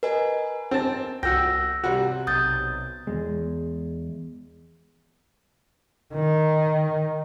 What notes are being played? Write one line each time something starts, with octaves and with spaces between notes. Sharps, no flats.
A#4 B4 D#5 G#5
C4 A5
C2 F#4 G5 E6 A#6
C3 G3 F#4
B1 C3 D#6 G6 A6
E2 G#3
D#3